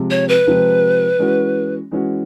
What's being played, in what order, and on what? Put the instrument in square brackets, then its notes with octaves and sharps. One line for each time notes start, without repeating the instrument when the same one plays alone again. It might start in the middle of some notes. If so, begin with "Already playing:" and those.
Already playing: [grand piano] C3 F3 G#3 C4
[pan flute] C#5
B4
[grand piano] C3 F3 G#3 C4
E3 G#3 C#4 F#4
E3 G#3 C#4 F#4